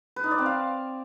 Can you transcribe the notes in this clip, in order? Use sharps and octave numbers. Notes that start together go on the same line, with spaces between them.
B4
D#4
D5
C4
F5